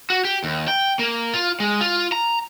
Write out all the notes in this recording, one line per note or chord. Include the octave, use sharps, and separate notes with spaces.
F#4
G4
D#2
G5
A#3
F4
G#3
F4
A#5